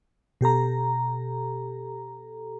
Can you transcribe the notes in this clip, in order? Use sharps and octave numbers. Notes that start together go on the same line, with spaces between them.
B2 G4 A4 A#5